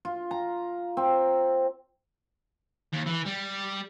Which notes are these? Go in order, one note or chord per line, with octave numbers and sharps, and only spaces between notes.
F4
A#5
C4
D#2
E3
G3